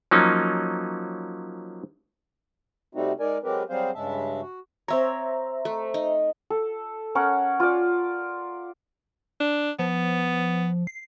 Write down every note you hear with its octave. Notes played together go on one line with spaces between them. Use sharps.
F3 F#3 A#3 C#4 D#4
C3 G3 A3 C4 D#4 F#4
G#3 D#4 A#4 D5 G#5
F#3 G#3 C4 G4 A#4 B4
F#3 G3 C4 G#4 C5 F5
G2 C#3 G#3 E5 A5
F#4
C4 C5 C#5 E5 A#5
A3
D#4
A4
C#4 A#4 C#5 F#5
F4 D5
D4
F3 B3
C7